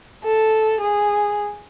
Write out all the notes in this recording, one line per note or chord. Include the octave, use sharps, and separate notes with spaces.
A4
G#4